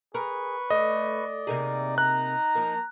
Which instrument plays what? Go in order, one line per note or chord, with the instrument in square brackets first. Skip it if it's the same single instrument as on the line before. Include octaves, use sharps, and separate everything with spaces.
[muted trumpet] G#4 [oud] A#4 [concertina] B4 C#6
[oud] A3 [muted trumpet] D5 [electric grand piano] D#5
[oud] C3 A#3 G#4 [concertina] D#4
[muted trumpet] A#5 [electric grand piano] F#6
[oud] F3 A#3